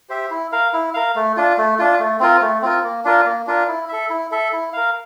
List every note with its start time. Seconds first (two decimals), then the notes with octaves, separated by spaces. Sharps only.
0.09 G4 C5 E5
0.30 E4
0.52 A#4 F5
0.73 E4
0.94 A#4 F5
1.16 A3
1.37 D4 F4
1.58 A3
1.79 D4 F4
2.00 A3
2.20 C4 F4 A#4
2.41 A3
2.62 C4 F4 A#4
2.84 A#3
3.05 D4 F4 A#4
3.25 A#3
3.47 D4 F4 A#4
3.68 E4
3.89 A4 E5
4.10 E4
4.31 A4 E5
4.53 E4
4.73 A#4 F5